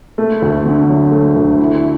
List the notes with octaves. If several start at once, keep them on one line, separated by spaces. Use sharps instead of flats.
A3
D2
D3
F#3
A3
D2
E4